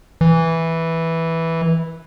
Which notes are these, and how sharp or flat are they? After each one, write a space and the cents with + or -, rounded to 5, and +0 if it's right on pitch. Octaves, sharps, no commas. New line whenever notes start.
E3 -5